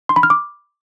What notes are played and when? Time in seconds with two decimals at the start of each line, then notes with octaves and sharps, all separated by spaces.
0.09 C6
0.16 B5
0.23 F6
0.30 D6